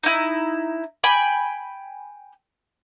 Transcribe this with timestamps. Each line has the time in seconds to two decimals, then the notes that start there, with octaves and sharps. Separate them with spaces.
0.03 D#4 E4
1.04 G5 G#5 B5